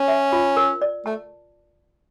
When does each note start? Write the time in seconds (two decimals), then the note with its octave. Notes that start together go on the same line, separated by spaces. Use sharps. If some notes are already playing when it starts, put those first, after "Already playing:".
Already playing: C#4 C#5
0.08 E5
0.32 F4
0.57 A#4
0.82 D5
1.06 A3 A5